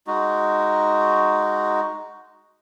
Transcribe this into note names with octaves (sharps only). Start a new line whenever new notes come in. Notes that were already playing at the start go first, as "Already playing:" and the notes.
G#3 D#4 F#4